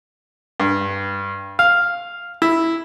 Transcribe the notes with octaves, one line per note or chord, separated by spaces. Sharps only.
G2
F5
E4